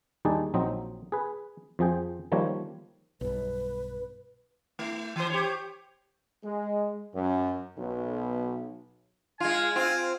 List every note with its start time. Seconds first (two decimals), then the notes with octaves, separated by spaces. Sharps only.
0.25 D#2 G3 D4 D#4 G#4 D5
0.54 A#1 F#3 C4 D#4 D#5
1.12 G#4 B4
1.79 F2 F3 G#4 G5
2.32 D#3 F3 G3 A#3 C#5
3.21 B1 G2 B4
4.79 A3 E4
5.16 E3 C5
5.30 G4 C5 C#5
6.44 G#3
7.13 F#2
7.76 B1
9.40 G#3 F4 G#5
9.76 C4 F4